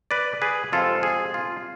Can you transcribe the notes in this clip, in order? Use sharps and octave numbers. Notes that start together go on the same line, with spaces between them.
B4 D5
G#4 B4
F2 C3 F3 G#3 C4 F4 A4
G#4
F4